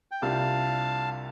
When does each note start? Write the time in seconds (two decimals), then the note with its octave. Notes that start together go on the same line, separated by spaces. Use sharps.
0.11 G5
0.22 C2 C3 G3 D4 F4 F5 A5